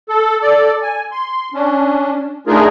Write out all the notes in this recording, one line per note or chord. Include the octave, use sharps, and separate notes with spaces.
A4
A4 D5
G#5
C6
C#4 D4
A3 D4 D#4 F4 G#4 A#4